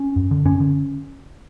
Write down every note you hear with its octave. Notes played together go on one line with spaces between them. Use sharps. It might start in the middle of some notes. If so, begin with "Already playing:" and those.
Already playing: C#4
F#2
D3
F#2 C#4
D3